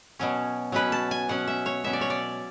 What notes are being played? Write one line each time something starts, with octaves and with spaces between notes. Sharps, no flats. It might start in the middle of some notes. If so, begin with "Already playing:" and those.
B2 F#3 C#4
B2 F#3 C#4 B4
A5
G#5
B2 F#3 C#4 F#5
E5
C#5
B2 F#3 C#4 E5
D5
C#5
D5